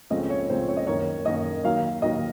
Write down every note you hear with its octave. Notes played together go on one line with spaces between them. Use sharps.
C#2 C#3 F3 A3 C4 D#5
C#5
C#2 C#3 F3 A3 C4 C5
C#5
D#5
F#2 D#3 A#3 C#5
F#2 D#3 A#3 D#5
D#2 D#3 F#3 F5
D#2 D#3 F#3 D#5